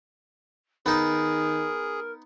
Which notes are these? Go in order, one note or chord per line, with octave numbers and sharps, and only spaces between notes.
D#3 B3 D#4 G#4 A#4